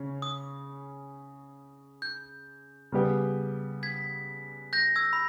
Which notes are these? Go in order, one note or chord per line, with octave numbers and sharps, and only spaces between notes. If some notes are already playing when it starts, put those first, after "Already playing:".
Already playing: C#3 C#4
D#6
G6
C#3 G3 B3 G4
G#6 B6
G6 A#6
E6 G#6
B5